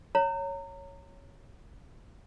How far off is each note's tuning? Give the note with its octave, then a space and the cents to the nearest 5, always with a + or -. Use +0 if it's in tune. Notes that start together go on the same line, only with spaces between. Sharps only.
C#5 +0 A#5 -30